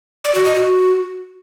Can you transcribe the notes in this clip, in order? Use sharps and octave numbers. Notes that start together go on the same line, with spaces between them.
D5
F#4
D#5
F#4